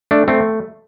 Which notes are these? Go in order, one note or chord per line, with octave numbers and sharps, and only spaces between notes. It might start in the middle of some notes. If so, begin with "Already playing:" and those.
A3 D4
A3 C4